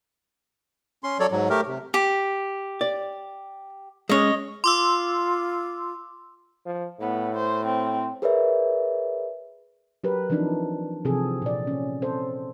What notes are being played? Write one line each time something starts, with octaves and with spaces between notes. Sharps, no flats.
C#4 C6
F#3 A4 C#5 D5
G#2 F#3
A3 G4 A#4
C3
G4
D5
G#3 C#4 C#5 D#5
F4 C6 D6 E6
F3
A2 B3
C5
C4
G#4 A#4 B4 C#5 D5 E5
F#3 G4 A#4 B4
E3 F3 C4 D4 D#4
C3 E3 F3 C4 G#4 A4
A#2 D5
C#4
C4 A4 C5